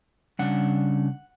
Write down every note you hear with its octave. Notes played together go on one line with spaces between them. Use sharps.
C#3 G3 D4 F#5